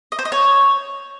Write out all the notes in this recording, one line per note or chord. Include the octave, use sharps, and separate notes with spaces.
D#5
C5
D#5
C#5